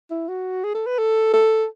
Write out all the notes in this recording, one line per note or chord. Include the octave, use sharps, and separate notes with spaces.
E4
F#4
G#4
A4
B4
A4
A4